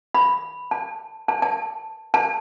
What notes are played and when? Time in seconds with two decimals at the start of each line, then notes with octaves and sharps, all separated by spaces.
0.14 B5
0.71 A5
1.28 A5
1.42 A5
2.14 A5